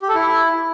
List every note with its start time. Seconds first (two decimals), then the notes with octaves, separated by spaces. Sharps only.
0.02 G4
0.09 A4
0.15 E4